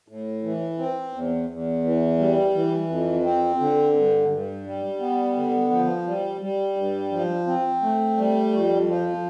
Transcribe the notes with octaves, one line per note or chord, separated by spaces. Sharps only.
A2
E3
C4
E2
E2
E3
G3
E3
F2
C4
D3
G2
G2
G3
B3
D3
F3
G3
G3
G2
F3
C4
A3
G3
F2
F3